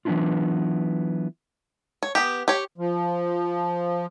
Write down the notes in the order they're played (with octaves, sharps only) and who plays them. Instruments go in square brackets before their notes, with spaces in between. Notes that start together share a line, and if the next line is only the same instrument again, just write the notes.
[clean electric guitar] E3 F#3 B3 D4 E4 F4
[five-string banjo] C#5
B3 G4
G4 C#5
[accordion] F3